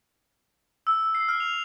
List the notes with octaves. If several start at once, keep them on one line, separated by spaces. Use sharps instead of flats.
E6
C7
F6
F7